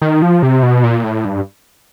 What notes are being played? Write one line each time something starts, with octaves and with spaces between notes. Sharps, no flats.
D#3
F3
C3
B2
A#2
A2
G2